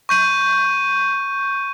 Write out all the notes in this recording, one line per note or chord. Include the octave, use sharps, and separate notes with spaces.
C#6 G6 D#7